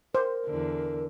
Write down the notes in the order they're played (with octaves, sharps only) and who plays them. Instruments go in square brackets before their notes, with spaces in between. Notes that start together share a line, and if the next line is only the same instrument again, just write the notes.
[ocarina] A#4 [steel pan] C5
[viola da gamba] E2 D3